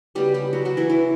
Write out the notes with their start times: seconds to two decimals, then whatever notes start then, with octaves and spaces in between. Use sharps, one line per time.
0.15 C#3 F#3 G3 B3 G4
0.34 G3 G4
0.53 F#3 F#4
0.65 F#3 F#4
0.77 E3 E4
0.89 E3 E4